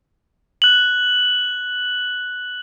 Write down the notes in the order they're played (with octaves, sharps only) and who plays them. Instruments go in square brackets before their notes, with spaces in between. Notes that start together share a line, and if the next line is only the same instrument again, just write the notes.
[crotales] F#6 F#7